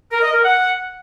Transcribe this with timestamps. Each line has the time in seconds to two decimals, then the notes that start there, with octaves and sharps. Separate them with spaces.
0.12 A#4
0.22 D#5
0.33 A#4
0.43 F#5